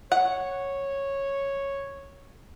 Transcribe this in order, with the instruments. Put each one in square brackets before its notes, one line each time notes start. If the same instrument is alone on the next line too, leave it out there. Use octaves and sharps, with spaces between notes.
[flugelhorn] C#5 [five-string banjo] F#5